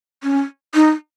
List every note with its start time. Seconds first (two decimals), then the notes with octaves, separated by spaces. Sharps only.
0.23 C#4
0.75 D#4